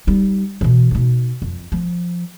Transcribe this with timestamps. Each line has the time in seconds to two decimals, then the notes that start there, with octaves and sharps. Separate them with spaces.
0.07 G3 D#4
0.61 B2 E3
0.91 B2 D#4
1.42 F2
1.72 F3